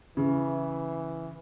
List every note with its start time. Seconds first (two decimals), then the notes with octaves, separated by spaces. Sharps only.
0.17 C#3 E3